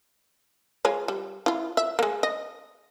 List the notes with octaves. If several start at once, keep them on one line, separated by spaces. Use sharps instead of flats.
G#3 F4 C#5
G3
E4 F4
E5
G#3 A#3
D#5